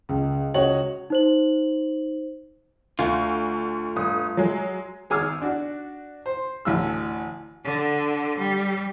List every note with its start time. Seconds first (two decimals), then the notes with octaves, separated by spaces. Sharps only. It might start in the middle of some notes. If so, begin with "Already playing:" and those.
0.09 C#2
0.54 C#2 F#4 C#5 D#5 F#7
1.10 D#4 C5 F#7
2.99 D2 A3 F4
3.96 G1 D#6
4.37 F#3 G#3
5.10 G#1 G#4 G#5 D6 E6 F6
5.42 D4 F#4
6.26 C5
6.65 A1 D2 E6
7.64 D3
8.38 G3